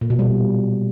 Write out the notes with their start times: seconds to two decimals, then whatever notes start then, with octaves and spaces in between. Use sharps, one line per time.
0.01 A#2
0.10 B2
0.19 G3